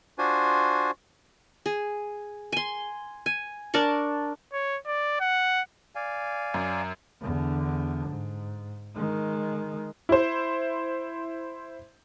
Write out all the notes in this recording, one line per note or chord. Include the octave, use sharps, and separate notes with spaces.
D4 F4 F#4 C5 G#5
G#4
G#5 C6
G#5
D4 A#4 A5 C#6
C#5
D5
F#5
D5 F5 G#5
F#2
E2 D3
G#2
D#3 G#3
E4 C5